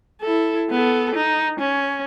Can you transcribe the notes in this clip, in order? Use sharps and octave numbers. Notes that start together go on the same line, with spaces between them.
E4 A4
B3 A4
D#4
C#4